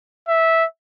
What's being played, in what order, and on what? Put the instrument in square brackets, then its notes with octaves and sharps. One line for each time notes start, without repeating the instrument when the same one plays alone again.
[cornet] E5